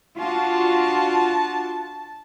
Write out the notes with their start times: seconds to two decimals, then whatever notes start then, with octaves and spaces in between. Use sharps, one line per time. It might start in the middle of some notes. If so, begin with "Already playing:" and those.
0.19 D4 F4 F#4 A5